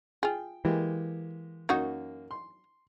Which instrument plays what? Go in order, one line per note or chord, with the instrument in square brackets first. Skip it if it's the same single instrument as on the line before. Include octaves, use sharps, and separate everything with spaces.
[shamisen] F4 G#4 [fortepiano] G5
[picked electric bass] E3 [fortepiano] G#3 A#3 G4
[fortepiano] F#2 A#3 [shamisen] F#3 D#4 F#4
[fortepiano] C6